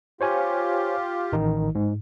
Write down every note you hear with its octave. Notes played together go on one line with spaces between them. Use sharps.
F4 G4 C5 C#5 G#5
A1 D#3 D#4
G#2